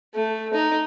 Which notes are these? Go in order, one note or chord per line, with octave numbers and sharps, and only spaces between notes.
A3
D#4